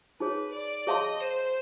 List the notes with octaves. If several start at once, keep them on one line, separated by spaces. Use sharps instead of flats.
D#4 G#4 B4 C#5
D5
G#4 C#5 D#5 F5 A5 C6
C5